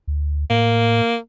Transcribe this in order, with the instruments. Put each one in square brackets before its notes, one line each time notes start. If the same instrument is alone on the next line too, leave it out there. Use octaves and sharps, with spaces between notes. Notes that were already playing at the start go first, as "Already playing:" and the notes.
[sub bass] D2
[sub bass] A2 [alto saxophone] A#3